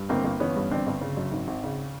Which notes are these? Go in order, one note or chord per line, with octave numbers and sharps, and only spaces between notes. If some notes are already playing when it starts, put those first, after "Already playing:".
Already playing: G2
G1 A#3 C4
G1
E3 B3 C#4
G2
G1 C4 D4
G1
C#3
F#2
G#1
G#1
C#3